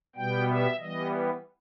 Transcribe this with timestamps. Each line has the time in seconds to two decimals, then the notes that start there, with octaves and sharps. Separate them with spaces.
0.15 B2 G3 B3 G5
0.47 E5
0.79 E3 G3 B3 D#5